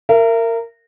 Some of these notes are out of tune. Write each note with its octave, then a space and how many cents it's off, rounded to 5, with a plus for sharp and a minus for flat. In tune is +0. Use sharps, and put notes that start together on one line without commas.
A#4 -20 E5 +35